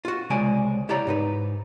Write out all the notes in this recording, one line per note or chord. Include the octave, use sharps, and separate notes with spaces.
F4 F#4
C2 C#3 G#3 D5 G#5
E4 G4 C#5 D5 A#5
G#2 D#4 B4